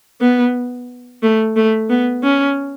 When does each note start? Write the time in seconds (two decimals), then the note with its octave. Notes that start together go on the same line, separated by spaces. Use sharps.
0.21 B3
1.22 A3
1.56 A3
1.90 B3
2.23 C#4